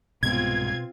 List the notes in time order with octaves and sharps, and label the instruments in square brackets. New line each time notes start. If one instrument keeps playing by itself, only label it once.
[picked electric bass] C2 G#2 [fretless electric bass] B2 B3 [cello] C4 F4 [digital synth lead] G#6